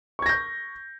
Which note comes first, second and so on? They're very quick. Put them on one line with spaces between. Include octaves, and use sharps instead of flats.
C#6 G#6 A#6 G6